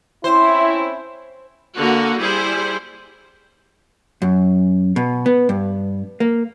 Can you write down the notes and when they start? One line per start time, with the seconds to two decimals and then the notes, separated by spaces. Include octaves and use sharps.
0.24 C4 C#4 E4 C5
1.78 D3 A#3 F#4
2.18 G3 E4 G#4 C5
4.22 F#2
4.96 B2
5.26 B3
5.49 G2
6.20 A#3